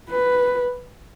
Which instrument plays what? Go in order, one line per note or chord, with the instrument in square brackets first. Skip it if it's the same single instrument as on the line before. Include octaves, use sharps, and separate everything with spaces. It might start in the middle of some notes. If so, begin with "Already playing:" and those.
[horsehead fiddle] B4